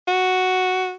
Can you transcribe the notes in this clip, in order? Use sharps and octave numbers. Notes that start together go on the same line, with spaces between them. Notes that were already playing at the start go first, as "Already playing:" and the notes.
F#4